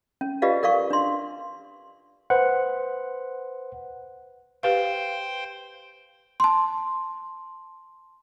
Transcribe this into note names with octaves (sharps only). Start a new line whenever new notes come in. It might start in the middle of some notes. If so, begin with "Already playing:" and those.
C#4
F4 G4 B4 D5 D#5 F5
A#4 D5 F5 C#6
D4 C6
B4 C5 F#5
G4 B4 C5 F5 G5 C6
A5 C6